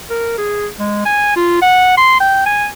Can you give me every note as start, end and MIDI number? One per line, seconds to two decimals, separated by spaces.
0.10 0.35 70
0.38 0.67 68
0.79 1.04 56
1.05 1.33 80
1.36 1.59 65
1.62 1.96 78
1.97 2.18 84
2.20 2.41 79
2.46 2.68 80